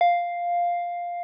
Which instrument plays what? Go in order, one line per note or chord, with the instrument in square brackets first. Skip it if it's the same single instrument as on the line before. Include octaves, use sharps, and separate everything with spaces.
[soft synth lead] F5